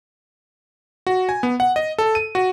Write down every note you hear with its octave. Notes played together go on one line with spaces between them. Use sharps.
F#4
G#5
B3
F#5
D#5
A4
D#7
F#4